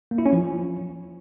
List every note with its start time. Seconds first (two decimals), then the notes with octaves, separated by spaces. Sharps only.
0.11 A#3
0.18 E4
0.26 C#4
0.33 F3